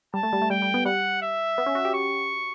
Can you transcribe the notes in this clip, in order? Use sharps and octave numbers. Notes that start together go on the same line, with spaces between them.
G3 A5
A3
G3
A3
G3 G5
G3
B3
G3 F#5
E5
B3
C#4
F#4
G4
C#6